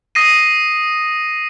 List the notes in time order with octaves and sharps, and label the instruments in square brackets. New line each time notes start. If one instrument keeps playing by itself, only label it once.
[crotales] D#6 A#6 C7 D#7